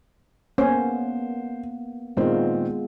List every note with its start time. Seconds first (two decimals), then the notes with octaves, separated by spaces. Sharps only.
0.58 A#3 B3 C#4 C5
2.17 A#2 D#3 G#3 B3 C4 F4